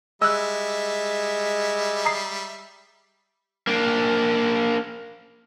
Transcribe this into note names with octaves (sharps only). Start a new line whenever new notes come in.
G3 G#3 E5 E6 F#6
A#5 D#6 C7
A#3 D4